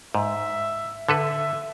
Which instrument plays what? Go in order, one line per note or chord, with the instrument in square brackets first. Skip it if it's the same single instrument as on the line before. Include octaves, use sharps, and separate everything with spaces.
[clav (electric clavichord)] G#2 [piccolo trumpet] E5
[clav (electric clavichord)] D3 A4 B4 [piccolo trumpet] E5